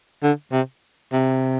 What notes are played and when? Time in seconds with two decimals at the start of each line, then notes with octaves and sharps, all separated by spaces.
0.23 D3
0.52 C3
1.13 C3